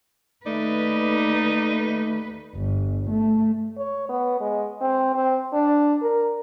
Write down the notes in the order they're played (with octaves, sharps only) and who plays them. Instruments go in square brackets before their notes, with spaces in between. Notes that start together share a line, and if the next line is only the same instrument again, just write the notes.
[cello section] D#2 B4 [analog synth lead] A3 [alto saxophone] D#4 [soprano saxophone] D5
[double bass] G1
A3
[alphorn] C#5
B3
G#3
C4
C4
D4
A#4